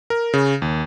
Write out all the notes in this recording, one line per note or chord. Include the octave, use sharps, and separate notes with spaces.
A#4
C#3
D#2